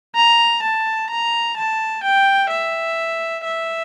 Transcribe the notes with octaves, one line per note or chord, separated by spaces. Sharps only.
A#5
A5
A#5
A5
G5
E5
E5